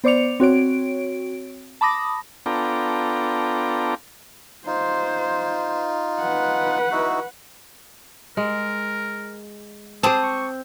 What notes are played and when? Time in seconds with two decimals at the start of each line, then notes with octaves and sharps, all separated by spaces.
0.04 B3 C5 D5 D6 C#7 F7
0.40 C4 F#4 C#5 D7
1.81 A5 B5 D6 D#6 A#6
2.46 B3 D4 F4 A4 G5 A#5
4.66 D#4 F4 C5
6.20 B4 F#5
6.92 D#4 E4 F#4
8.37 G#3 A#4
10.03 C4 G#4 C5 A5 D6 D#6
10.23 C#6